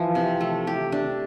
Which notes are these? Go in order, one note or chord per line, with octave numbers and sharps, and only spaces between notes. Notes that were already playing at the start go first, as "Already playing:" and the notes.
Already playing: E3 F3
C3
A3
G4
D4